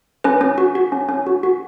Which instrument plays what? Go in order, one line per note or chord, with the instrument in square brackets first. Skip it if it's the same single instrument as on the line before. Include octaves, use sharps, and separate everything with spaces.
[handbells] C#4 B4
C#4
F#4
F#4
C#4
C#4
F#4
F#4